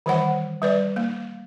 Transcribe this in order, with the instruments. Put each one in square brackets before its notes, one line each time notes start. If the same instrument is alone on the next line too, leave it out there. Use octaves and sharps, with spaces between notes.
[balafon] D#3 E3 G3 C5 C#5 F#5
G3 B4 D5
A#3